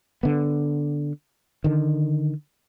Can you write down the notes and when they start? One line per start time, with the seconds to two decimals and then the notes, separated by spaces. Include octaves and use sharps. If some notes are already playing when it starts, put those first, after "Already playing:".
0.23 D3 B3
1.64 D3 D#3